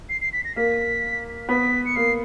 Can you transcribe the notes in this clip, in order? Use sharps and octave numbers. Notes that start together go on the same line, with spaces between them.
C7
C7
B6
A#6
A#3 B6
B3 B6
C#7
A#3 C7